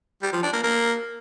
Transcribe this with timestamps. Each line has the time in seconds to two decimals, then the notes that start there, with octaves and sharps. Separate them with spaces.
0.23 G3
0.33 F3
0.43 D4
0.53 A#3
0.63 A#3